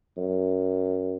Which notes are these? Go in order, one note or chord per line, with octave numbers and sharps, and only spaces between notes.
F#2